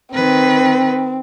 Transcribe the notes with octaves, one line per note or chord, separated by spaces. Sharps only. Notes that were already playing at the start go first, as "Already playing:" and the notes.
D#3 C4 B4